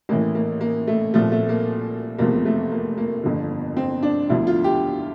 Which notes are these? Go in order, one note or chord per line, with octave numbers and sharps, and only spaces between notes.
A1 A2 E3 A#3
A#3
A#3
A3
C2 A#2 F3 A3
A3
A#3
F1 E2 C3 F3 A#3
A3
A#3
A#3
G1 F2 D3
C4
D4
E1 D2 D3 F3 E4
F4
G4